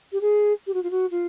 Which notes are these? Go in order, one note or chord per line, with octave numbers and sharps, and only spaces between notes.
G4
G#4
G4
F#4
F4
F#4
F4